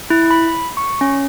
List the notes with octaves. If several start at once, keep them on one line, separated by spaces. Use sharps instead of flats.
E4
B5
C#6
C#4